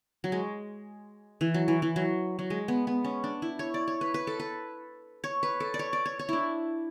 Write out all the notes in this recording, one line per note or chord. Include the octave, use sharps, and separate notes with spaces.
F#3
G#3
E3
F#3
E3
E3
F#3
F#3
G#3
B3
B3
C#4
D4
E4
C#5
D5
C#5
B4
B4
A4
B4
C#5
B4
A4
D5
C#5
D5
C#5
C#5
D4 E4